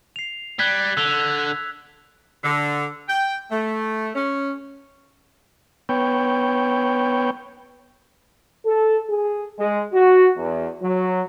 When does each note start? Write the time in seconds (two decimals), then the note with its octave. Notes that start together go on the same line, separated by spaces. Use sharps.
0.16 C7 F7
0.59 G3 F#6 G#6 B6
0.97 D3 E6 F7
2.44 D3
3.09 G5
3.51 A3
4.15 C#4
5.89 B3 C#5 G5
8.65 A4
9.09 G#4
9.59 G#3
9.93 F#4
10.37 E2
10.83 F#3